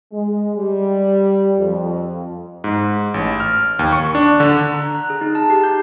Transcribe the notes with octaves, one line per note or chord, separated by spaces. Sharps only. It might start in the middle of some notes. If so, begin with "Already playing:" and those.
G#3
G3
F2
G#2
A1
F6
D#2
C#6
D4
D3
A#5
F#6
G#4
D#4
A5
G4
G6